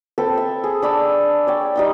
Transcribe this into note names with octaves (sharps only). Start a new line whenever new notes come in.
C4 A4 B4 G5
E5
G#4
D4 B5 D6 E6
C#5 D5 G5
G3 D#4 G5